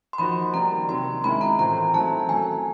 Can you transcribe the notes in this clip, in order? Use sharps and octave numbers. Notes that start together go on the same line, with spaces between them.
C6
F3 A#3 D#4 F#4 B5
D#3 G3 A#3 A#5
C3 D#3 F#3 C6
D#3 G#3 C#4 E4 B5
A#5
A2 E3 A3 C4 F4 A#5
D#3 F#3 A3 C4 E4 A5
F#3 A3 C#4 G#5